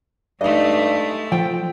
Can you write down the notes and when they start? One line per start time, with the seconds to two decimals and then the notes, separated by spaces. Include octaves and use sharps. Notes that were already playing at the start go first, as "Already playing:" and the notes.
0.41 G2 G#3 A3 D#4 D#5
1.32 F3 C4 G5